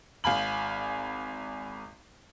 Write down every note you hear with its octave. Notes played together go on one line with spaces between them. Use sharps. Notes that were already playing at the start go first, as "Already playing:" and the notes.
G#1 F5 G#5 B5 F#7